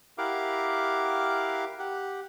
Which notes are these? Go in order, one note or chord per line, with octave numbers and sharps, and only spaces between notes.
E4 G4 A#4 F5 F#5 D6
G4 F#5